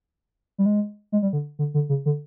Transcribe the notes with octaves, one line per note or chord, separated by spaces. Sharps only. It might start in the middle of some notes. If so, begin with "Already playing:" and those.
G3
G#3
G#3
G3
D3
D3
D3
C#3
D3